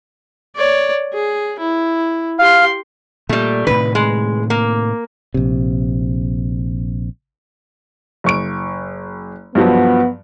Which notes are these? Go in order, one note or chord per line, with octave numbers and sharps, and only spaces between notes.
C#5 D5
G#4
E4
G4 F5 C6
A#2 G3 A3
A2 C3 D#3 B4
G#3
A#3
A#1 C3
F#1 C#6 D7
G2 F3 F#3 B3